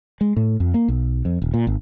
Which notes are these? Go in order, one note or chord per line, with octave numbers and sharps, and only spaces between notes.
G#3
A2
F2
A#3
B1
F2
D#1
A#2
G#1